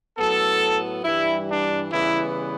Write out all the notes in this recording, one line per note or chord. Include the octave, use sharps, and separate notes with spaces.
A2 F#3 B3 A4
G2 E3 G3 E4
D4
C#3 E3 G3 B3 E4